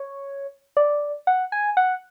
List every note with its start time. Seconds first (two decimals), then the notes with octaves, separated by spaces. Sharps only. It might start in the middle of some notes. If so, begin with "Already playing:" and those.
Already playing: C#5
0.77 D5
1.27 F#5
1.52 G#5
1.77 F#5